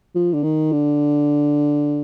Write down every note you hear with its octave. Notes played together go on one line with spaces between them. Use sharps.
F3
D3
D#3
D3